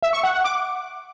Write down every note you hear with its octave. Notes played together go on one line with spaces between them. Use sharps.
E5
C#6
F#5
F#5
D6